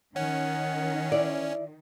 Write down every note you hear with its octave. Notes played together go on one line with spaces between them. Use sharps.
D#3 C#4 F#5
E4 D5